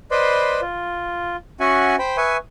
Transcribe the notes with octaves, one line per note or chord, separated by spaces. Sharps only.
B4 C5 D5 D#5 B5 C6
F4
C#4 F#4 E5 F#5 G#5
C5 G5 B5
B4 E5 G#5 C#6 D#6